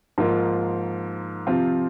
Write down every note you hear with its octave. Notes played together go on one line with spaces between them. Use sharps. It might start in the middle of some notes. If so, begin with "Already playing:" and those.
G#2 F3 A#3 F4
C3 F3 C4 F4